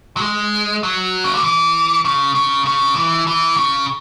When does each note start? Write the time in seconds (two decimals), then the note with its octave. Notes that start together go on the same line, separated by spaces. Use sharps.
0.17 F#3
0.21 G#3
0.83 F#3
1.24 C#3
1.34 D3
1.44 E3
2.05 C#3
2.35 C#3
2.66 C#3
2.96 E3
3.27 E3
3.57 C#3